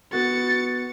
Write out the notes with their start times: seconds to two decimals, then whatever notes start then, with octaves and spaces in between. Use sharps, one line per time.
0.13 B3 F#4 A6 C#7